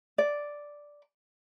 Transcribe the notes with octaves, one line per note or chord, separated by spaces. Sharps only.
D5